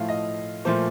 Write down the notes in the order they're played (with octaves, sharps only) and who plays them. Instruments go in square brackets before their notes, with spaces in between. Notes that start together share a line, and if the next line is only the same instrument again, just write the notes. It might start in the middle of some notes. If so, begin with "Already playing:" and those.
Already playing: [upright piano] A2 F3 A3 F5
D#5
A#2 F3 A3 C5